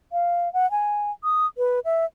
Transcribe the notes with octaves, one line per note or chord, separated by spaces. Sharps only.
F5
F#5
G#5
D#6
B4
E5